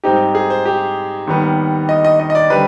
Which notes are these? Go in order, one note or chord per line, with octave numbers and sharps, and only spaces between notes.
G#2 G3 C4 D#4 G4
G#4
C5
G4
D#2 D#3 G3 B3
D#5
D#5
D#5
D#5
D5
D3 G3 C4 B4